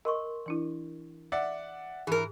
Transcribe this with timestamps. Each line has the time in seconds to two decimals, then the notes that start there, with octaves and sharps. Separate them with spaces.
0.05 A#4 D#5 C6 C#6
0.46 E3 D4 E4
1.32 D5 E5 F#5
2.07 G#2 E3 G#4 A#4